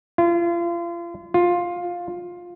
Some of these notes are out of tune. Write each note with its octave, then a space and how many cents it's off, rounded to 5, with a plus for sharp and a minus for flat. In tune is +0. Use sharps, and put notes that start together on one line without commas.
F4 -35
F4 +10